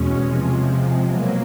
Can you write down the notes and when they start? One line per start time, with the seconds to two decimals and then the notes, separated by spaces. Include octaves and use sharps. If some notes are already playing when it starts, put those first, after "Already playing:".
Already playing: E2 B2 G#3 C#4
0.25 C3 F3 G#3
1.02 B2 F#3 A#3